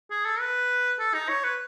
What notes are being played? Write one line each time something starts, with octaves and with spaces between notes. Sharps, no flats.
G#4
A4
B4
A4
D#4
C#5
B4